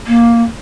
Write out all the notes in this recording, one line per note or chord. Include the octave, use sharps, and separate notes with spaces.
A#3